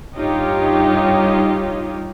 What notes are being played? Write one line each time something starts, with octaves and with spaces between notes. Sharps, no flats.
G2 D#4 F4 G4 C#5